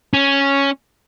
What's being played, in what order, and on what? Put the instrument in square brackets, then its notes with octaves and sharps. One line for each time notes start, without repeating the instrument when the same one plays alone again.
[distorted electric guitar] C#4